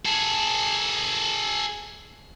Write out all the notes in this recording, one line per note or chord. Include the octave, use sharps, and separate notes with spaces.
G#4 A4